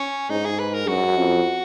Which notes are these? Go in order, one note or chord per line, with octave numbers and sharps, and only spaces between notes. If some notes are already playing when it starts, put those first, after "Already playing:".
Already playing: C#4
G#2 D#4
G#4
B4
A#4
F#2 F#4
F2